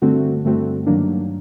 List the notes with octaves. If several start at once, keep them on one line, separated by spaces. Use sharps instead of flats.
G2 D3 A3 C4 F#4
G2 D3 A3 C4 F#4
G2 D#3 F#3 A#3 D4